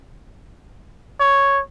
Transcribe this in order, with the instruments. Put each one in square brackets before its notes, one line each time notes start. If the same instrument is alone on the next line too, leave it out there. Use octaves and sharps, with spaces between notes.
[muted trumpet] C#5